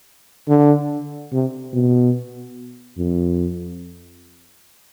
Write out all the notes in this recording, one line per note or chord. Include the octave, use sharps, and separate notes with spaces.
D3
C3
B2
F2